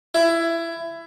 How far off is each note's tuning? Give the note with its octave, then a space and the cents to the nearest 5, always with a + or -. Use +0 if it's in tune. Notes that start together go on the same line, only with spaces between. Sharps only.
E4 +20